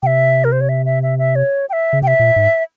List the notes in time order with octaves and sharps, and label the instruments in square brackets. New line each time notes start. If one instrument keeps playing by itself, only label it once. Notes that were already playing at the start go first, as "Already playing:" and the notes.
[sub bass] C3 [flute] E5 G5
[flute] A#4
C5
C#5
E5
E5
E5
E5
C#5
G5
E5
[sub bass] C#3
[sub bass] C3 [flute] G5
[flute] E5
[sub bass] A#2
G#2